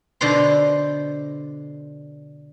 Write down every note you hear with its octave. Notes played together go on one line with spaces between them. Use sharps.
B2 D3 B4 C5 C6